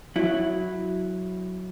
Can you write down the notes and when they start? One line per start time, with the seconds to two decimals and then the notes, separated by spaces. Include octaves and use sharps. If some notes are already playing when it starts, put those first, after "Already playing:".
0.16 F#3 E4